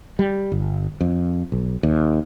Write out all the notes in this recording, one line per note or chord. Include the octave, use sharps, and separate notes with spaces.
G3
G1
F2
B1
D#2